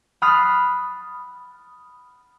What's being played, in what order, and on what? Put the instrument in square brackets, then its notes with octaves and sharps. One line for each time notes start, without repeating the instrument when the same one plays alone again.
[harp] B5 D#6 F6 F#6 A6 C7